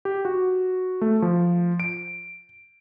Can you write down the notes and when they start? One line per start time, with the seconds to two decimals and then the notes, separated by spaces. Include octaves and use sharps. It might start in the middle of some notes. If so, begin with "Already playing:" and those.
0.05 G4
0.25 F#4
1.01 A3
1.22 F3
1.80 D7